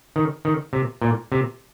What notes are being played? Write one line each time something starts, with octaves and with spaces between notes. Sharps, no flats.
D#3
D#3
C3
A#2
C3